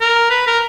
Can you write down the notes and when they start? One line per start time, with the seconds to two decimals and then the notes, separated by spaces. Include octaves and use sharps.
0.01 A#4
0.30 B4
0.47 A#4